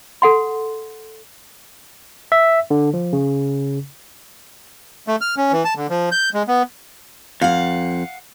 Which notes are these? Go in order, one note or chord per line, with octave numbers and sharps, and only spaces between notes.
A4 F#5 C6
E5
D3
F3
C#3
A3
F6
C#4
E3
A5
D3
F3
G6
G#3
B3
F2 F5 F#5